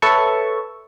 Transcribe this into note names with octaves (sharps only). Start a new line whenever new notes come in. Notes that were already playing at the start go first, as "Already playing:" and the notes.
A4 B4 C#5 E5 A5 C#6